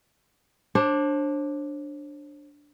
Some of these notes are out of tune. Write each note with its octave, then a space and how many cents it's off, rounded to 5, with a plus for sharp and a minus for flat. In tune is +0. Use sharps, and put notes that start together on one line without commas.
D4 +0 C5 +45